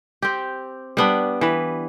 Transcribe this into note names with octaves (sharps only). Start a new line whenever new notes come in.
C4 G4
G3 B3 D4
E3 B4